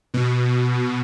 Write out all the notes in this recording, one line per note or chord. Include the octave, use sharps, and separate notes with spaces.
B2